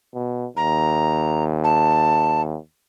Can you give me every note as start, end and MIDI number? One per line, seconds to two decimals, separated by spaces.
0.14 0.47 47
0.57 2.57 39
0.57 1.44 82
1.64 2.42 81